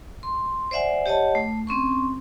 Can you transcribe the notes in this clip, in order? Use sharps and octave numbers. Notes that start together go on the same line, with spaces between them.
C6
C5 D5 E5 F#5 G#5
G4 C#5 D#5 F#5 A5
A3
C4 C#4 C6 C#6